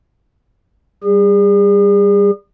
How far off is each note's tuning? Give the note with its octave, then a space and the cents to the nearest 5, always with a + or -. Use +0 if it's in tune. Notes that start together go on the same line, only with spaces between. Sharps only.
G3 +0 G#4 -40